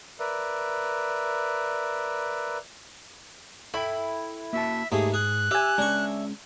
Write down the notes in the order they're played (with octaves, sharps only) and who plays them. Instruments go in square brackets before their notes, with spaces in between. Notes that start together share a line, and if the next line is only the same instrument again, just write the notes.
[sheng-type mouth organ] A#4 B4 D5 E5
[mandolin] E4 [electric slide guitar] A4 G5 [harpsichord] B5
[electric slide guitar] A#3 F#4 A5 [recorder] E5
[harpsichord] D#2 A3 [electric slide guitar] G#2 [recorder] G#4
[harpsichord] G#4 [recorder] F#6
[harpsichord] G4 [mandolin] E5 G#5
[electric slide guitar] G#3 C#4 [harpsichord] D4 C#6